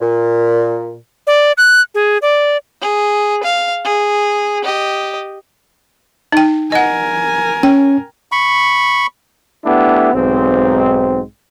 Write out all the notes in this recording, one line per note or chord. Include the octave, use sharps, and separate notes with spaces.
A#2
D5
F#6
G#4
D5
G#4
F5
G#4
G4 D#5
D#4 G5
A#4 D#5 F#5 G#5
C#4 G5
B5 C#6
A3 B3 D4 E4 G4
B1 G#2 C4